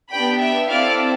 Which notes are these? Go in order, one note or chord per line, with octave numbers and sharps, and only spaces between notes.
B3 D4 G4 G5 B5
E5 G5
C4 E4 A4 D5 F5